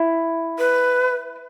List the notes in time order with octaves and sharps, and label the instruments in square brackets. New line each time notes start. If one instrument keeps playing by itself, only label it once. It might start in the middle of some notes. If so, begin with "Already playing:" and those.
Already playing: [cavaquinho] E4
[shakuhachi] B4